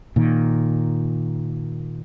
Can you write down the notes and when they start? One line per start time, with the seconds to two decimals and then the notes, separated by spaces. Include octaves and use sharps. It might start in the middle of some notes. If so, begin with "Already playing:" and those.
0.16 A#2 D#3